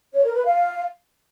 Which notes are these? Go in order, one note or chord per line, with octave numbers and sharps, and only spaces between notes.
C#5
A#4
B4
F5